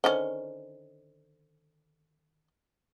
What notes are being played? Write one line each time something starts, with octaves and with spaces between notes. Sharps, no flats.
D3 D#3 C#4 C5